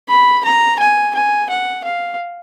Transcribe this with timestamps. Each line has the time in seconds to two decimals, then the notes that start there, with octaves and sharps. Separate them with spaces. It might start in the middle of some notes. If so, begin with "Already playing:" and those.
0.09 B5
0.45 A#5
0.79 G#5
1.15 G#5
1.50 F#5
1.85 F5